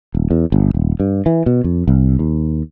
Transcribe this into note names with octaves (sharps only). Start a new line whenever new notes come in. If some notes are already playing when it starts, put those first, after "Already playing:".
D#1
E2
G1
D#1
G2
E3
B2
F2
C2
D#2